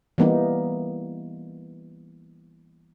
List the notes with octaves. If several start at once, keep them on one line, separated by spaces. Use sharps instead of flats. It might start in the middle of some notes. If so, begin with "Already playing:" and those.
E3 G3 A#3 B3 D#4